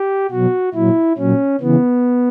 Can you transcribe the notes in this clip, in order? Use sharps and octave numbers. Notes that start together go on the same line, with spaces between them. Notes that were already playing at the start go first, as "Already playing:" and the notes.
Already playing: G4
B2 F#3 F#4
A#2 F#3 E4
A#2 F#3 C#4
C#3 E3 B3